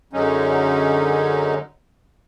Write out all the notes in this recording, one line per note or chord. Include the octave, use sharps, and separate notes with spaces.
F#2 D3 F#3 G#3 C#4 D#4